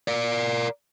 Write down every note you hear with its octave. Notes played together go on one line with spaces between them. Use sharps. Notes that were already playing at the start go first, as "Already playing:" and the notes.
A#4 D5